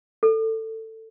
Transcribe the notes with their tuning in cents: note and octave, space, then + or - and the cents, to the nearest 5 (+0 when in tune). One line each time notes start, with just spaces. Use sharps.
A4 +15